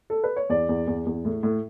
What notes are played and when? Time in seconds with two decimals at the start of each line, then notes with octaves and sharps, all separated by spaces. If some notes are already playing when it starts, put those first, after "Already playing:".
0.10 A4
0.24 B4
0.36 C#5
0.49 E2 D5
0.69 E2
0.87 E2
1.06 E2
1.25 A2
1.43 A2